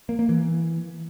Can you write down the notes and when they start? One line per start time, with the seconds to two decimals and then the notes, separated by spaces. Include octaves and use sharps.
0.09 A#3
0.19 A#3
0.29 E3